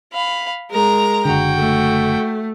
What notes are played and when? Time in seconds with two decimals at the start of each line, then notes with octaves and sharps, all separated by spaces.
0.12 F5 B5
0.71 G#3 A#4 A#5
1.25 F#1 D3 F#4 G5
1.57 A3